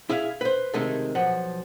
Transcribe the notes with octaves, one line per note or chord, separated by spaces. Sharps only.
E4 G#4 E5 F5
B4 C5
C3 D#3 G#3 A3
B1 F3 F#5